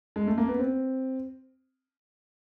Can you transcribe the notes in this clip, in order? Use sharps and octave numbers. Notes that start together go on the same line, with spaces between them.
G#3
A3
A#3
B3
C4